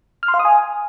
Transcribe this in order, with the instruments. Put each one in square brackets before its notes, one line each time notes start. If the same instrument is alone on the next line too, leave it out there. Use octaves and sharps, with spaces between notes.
[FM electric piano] F6
C6
F5
D#6
G#5